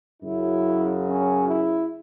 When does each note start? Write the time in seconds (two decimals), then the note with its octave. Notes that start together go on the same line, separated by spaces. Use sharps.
0.21 F#2 C#3 F#3 E4
1.06 C#4
1.47 E4